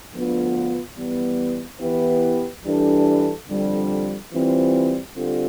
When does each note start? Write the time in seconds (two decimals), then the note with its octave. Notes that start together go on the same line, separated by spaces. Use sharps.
0.13 D2 D3 F3 B3 F4
0.97 E3 G3 B3
1.80 E3 B3 E4 G4 B4
2.64 E3 G3 D4 A4
3.48 F2 D3 G3
4.32 E3 G3 C4 F4
5.15 D3 G3 C4 F4 A4